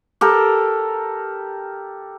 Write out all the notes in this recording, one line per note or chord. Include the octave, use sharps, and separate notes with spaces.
G4 A4 A#4